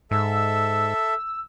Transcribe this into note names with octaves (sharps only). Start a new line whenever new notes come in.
G#2 A4 E5 E6